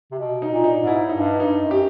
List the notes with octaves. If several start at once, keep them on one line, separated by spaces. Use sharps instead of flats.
C3
B2
D#4
A#2
D#4
G#2
E4
G2 D#4
D#4
F#2
G4